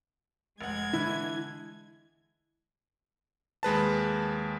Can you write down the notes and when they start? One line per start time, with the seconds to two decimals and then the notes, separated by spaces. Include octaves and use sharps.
0.61 F1 G#3 F#5 G#6
0.94 D3 E3 E4
3.63 D#2 G#3 B4 A5